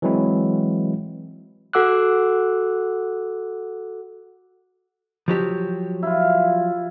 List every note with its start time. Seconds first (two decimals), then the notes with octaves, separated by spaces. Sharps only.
0.02 E3 F#3 G#3 C4 E4
1.73 F#4 A4 F#5 D6 E6 F#6
5.28 F3 F#3 G4
6.03 E4 F4